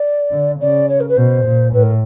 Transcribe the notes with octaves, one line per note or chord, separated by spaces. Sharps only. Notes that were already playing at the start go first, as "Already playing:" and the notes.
Already playing: D5
D3
C#3 D5
C#5
A#4
B4
B2 C5
A#2
A2 B4
A#4